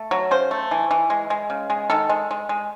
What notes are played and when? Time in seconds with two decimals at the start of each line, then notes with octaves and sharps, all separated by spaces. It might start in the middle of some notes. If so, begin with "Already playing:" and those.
Already playing: A3
0.11 F#3
0.31 C#3 C5
0.51 A3
0.71 E3
0.91 E3
1.10 G#3
1.30 G#3
1.50 C#3
1.70 G#3
1.90 D#3 A4
2.10 G#3
2.31 G#3
2.49 G#3